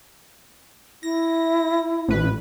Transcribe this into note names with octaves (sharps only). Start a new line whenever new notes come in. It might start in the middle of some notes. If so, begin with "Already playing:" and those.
E4 A#6
A1 B4